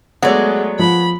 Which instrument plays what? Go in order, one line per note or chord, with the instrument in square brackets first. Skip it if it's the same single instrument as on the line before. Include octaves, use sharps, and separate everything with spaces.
[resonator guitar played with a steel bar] F#3 D5 [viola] G#3 A3 [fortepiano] B3 C#5
[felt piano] F3 [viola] B5